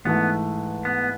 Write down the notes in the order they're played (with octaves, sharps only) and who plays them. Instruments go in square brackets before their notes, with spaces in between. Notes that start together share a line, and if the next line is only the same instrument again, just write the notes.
[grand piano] G#2 E3 A3 [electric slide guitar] B3
[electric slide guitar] B3